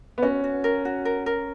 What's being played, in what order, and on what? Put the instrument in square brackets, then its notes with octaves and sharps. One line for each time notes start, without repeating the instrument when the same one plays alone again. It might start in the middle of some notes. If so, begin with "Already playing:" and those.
[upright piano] B3
[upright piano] C#4 [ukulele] F#4
[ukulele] F#4
A#4
F#4
A#4
A#4